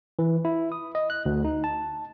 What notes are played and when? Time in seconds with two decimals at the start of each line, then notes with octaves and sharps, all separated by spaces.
0.19 E3
0.45 E4
0.72 D#6
0.95 D#5
1.10 F#6
1.26 D2
1.45 D#4
1.64 A5